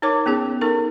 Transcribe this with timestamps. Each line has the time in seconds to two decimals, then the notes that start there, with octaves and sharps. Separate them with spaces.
0.02 D#4 A#4 C#5 D6
0.26 B3 C#4 G#4 A5
0.61 D#4 A4 A#4 C#6